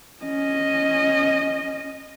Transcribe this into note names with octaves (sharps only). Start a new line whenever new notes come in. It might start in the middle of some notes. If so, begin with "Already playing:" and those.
C#4 D#5